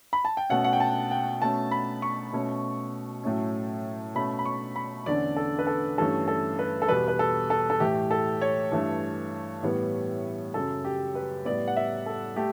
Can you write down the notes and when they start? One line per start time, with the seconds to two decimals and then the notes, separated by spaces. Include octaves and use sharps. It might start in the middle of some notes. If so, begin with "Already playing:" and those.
0.13 B5
0.25 A5
0.37 G5
0.50 B2 A3 C#4 F#5
0.64 F#5
0.73 G5
0.80 A5
1.11 G5
1.42 B2 A3 C#4 A5
1.71 B5
2.02 C#6
2.33 B2 A3 C#4
3.23 A2 F#3 A3 C#4
4.15 B2 A3 C#4 B5
4.39 B5
4.46 C#6
4.76 B5
5.06 E2 D3 A3 C#4 D5
5.36 A4
5.59 B4
5.67 A4
5.98 G2 E3 A3 C#4 A4
6.28 A4
6.59 B4
6.82 A4
6.88 E2 B2 G3 B4
7.08 B4
7.19 A4
7.50 A4
7.70 A4
7.80 A2 E3 A3 G4
8.11 A4
8.42 C#5
8.71 G2 E3 A3
9.63 A2 E3 G3 B3
10.54 F#2 C#3 F#3 A4
10.85 G4
11.15 B4
11.45 A2 G3 B3 D5
11.68 F#5
11.77 E5
12.06 A4
12.36 A3 G4